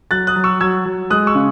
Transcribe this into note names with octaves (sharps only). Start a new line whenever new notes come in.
F#3 F#6 A6
D#6 F#6
F#3
C#6 E6
F#3 E6 G#6
F#3
G#3 D#6 F#6
C#6 E6
C#3